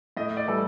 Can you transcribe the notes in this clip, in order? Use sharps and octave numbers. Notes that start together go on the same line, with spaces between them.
A2 D#5
D5
E3 G3 A4